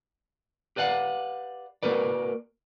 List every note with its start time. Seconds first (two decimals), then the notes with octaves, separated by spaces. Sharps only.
0.76 G4 B4 D5 F5 F#5
1.83 A#3 B3 F#4 A#4 B4 D5